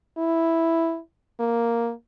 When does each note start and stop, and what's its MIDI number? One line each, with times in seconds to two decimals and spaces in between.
0.18 0.99 64
1.40 1.92 58